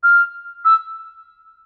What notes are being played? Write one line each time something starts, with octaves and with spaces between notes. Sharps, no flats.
F6
E6